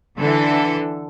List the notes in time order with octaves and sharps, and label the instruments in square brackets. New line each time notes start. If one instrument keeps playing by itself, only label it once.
[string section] D3 E3 A4